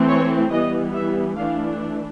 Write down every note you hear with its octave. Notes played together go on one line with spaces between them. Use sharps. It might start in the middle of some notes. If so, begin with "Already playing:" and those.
Already playing: E3 A3 C4
C#5
E3 G3 B3 D#5
E5
E3 A3 D4 F5